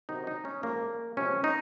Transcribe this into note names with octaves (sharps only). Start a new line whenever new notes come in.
C3 D#3 F#3 D#4
D#4
C#4
A#2 F3 G#3 A#3
C3 F3 G#3 C#4
D#4